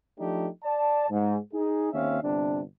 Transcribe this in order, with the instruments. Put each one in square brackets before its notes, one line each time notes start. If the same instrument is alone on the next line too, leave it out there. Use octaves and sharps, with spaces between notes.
[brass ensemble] F3 A3 D4 D#4 G4
D5 A5
G#2
D#4 G#4
D#2 C4 C#4 E5 F5
G1 C3 D4